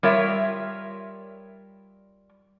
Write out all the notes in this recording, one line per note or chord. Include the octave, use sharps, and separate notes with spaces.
G3 F4 A#4 C#5 E5